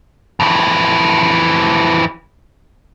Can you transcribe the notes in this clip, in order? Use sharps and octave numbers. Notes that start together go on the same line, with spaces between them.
F2 E3